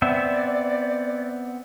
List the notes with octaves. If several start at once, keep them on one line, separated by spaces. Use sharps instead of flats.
B3 C4 D5 E5